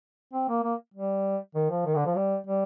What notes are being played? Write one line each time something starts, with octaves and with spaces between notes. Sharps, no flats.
C4
A#3
A#3
G3
D#3
F3
D#3
D3
F3
G3
G3